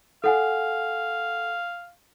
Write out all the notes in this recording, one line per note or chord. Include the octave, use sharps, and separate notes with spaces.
A4 F5 F#5 G#5